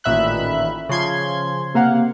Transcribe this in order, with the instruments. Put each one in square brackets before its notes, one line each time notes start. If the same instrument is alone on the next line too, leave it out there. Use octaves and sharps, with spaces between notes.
[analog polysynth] A1 A#2 D#3 E5 B5 F#6
C#3 F3 C6 G#6
C3 A#3 F5 F#5